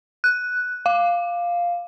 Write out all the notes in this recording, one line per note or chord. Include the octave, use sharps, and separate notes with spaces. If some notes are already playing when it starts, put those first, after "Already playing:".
F#6
F5